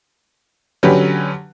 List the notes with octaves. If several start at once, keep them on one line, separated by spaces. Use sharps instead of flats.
D3 F#3 C#4 G4 B4